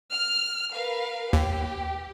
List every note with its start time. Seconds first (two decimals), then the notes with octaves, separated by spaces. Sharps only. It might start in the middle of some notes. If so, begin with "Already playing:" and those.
0.13 F6
0.73 A#4 B4 F5
1.33 D#2 G4